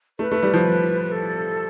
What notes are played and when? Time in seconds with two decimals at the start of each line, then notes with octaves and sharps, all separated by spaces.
0.19 A3 B4
0.32 A3
0.43 G3
0.54 F3
1.12 A4